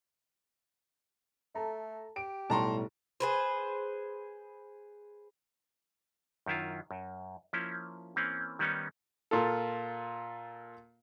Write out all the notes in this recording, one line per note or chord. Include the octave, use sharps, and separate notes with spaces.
A3 A4 A5 A#5
G4 D7
B1 A2 G3 A5 A#5 C6 C#6
G#4 B4 C5
F#2 D#3 E4 F4
F#2
F3 A#3 C#4 E4
E3 A#3 C4 C#4
D#3 G3 B3 C#4 D#4
A#2 F4 A4